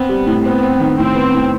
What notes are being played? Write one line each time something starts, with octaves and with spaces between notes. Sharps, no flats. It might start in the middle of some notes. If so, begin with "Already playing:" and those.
Already playing: B3 C4
G3
A2
B3 C4
C4
D#3
A2 C4
B3
A2